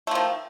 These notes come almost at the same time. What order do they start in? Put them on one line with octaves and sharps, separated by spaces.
A3 F3 D#3